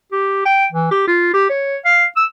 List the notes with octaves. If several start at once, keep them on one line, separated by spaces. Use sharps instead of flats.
G4
G5
E3
G4
F4
G4
C#5
F5
E6